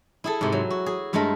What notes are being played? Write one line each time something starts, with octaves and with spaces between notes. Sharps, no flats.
E4 G#4 A4
G#2 C3
F#3
F#4
G#4
G2 G#3 A3 A4 A#4 B5